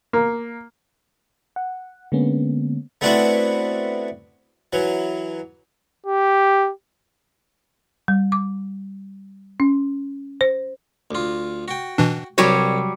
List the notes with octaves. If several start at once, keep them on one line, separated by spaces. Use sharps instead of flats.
A#3
F#5
D3 G#3 A#3 B3 C#4
A3 B3 C4 D4 E4 F#4
E3 F#3
G4
G3
D6
C#4
C5
D2 F4
F#4 G5
B2 E3 D4
C2 F#3 G3 F#4 C#5 D6